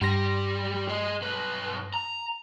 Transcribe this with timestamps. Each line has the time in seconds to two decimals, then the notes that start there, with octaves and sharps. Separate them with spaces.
0.01 G2 G3 G4 C6 A#6
0.89 G#4 D#5
1.21 B1 B4
1.94 A#5